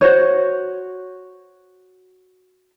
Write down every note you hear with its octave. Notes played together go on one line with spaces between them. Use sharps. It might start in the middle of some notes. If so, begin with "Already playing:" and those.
F#4 C5 C#5